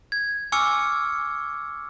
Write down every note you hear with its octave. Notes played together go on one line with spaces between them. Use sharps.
G#6
G#5 C#6 D6 E6 F6 C#7